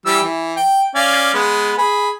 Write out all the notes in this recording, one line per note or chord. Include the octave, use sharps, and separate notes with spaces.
E3 G3 E6
E3
G5
C#4 D5 F5
G#3 B3
G#4 B5